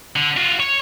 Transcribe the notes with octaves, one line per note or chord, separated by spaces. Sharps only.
D3
F4 F#4
C#5